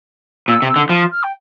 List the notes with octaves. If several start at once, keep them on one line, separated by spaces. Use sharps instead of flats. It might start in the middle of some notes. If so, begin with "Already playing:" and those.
A#2 E6
C3
E6
D3
F3 F6
F6
G5